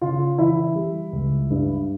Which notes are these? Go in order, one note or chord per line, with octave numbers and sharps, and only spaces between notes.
C#3 F4
E3 E4
G3
C#2
G2